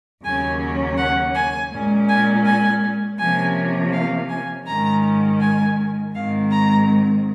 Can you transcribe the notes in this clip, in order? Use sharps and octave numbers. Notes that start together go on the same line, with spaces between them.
D#2 C#3 F#3 A#3 C#4 G#5
F#5
G#5
A#2 G#3 C#4
G#5
G#5
C3 F3 A#3 C#4 G#5
F5
G#5
G#2 D#3 G#3 C#4 A#5
G#5
G#2 D#3 G#3 C4 F5
A#5